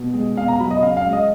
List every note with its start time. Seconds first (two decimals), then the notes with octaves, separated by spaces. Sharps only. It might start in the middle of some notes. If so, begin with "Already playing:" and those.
Already playing: B2
0.14 G#3
0.36 B2 F5
0.48 A#5
0.60 F#3 B5
0.71 D#5
0.82 C#3 F5
0.97 F5
1.05 G#3
1.13 D#5